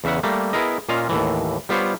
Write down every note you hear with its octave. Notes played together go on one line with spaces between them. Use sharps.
E2 C#3 E5 F#5
G3 A3 A#3
B3 E4 G#4 A#4 D#5
A#2 C#4 F4 D#5 F5
D#2 A2 E3
G3 B3 F4 G4 C5 C#5